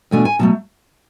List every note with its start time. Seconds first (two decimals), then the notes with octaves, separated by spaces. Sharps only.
0.11 E2 B2 A3 D4 G#5
0.25 G#5
0.39 B2 F#3 A3 A5